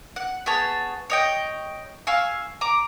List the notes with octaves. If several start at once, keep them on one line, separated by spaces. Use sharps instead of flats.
F#5
B3 G#4 C#5 A5
C#5 D#5 G5
F5 G#5 C#6 E6
A#5 D6